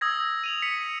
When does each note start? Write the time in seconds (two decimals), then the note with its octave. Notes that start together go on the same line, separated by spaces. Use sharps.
0.01 D#6 E6 G#6 A#6
0.44 D#7 F7 F#7
0.62 B6 C#7 F#7